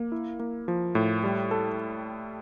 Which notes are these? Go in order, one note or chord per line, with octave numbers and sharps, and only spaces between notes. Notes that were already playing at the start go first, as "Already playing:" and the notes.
Already playing: A#3
E4
A#3
F3
A2
G3
A4